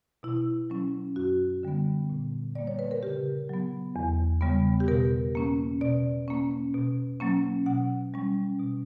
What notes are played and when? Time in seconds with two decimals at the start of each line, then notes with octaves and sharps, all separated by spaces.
0.23 B2 E4
0.70 F#3 C#4
1.16 F#2 F#4
1.63 D3 G3 B3
2.10 A#2
2.55 G3 A#3 D5
2.67 C#5
2.79 B4
2.91 A#4
3.03 C#3 G4
3.49 F#3 B3
3.96 E2
4.41 C#3 G3 B3
4.80 G4
4.88 B2 A#4
5.35 A#3 C#4
5.81 B2 D5
6.28 A#3 C#4
6.74 B2
7.20 F#3 A#3 C#4
7.66 B2 F#5
8.14 G3 C#4
8.59 B2